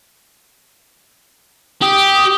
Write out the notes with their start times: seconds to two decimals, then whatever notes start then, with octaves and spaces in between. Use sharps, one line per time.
1.82 G4 D#6